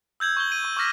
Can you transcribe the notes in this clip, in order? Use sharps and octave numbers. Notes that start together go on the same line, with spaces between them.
E6 G6 G#6 F#7
C#6 G6 G7
D#7
C#6
C#6 D6 F6 A#6 B6